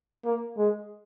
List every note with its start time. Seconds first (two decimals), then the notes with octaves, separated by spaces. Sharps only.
0.25 A#3
0.57 G#3